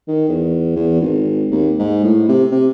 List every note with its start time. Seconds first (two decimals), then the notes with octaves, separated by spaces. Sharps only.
0.08 D#3
0.29 E2
0.76 E2
1.01 G#1
1.52 D#2
1.79 G#2
2.04 A2
2.29 C3
2.52 C3